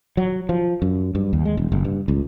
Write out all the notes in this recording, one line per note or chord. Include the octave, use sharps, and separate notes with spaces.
F#3
F3
F#2
G2
D#2
G#3
E1
F#1
G2
C#2